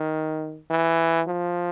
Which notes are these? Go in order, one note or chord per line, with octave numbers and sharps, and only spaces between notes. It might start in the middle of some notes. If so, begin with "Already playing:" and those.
Already playing: D#3
E3
F3